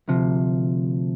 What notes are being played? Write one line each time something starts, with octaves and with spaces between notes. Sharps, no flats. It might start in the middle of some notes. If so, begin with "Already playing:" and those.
D2 C3 F3